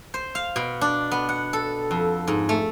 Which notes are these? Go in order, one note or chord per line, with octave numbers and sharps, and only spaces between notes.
C5
F5
B2
D4
B3
F#5
A4
F2
G#2
A3